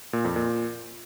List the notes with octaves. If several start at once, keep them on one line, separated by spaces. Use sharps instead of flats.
A#2
F2
A#2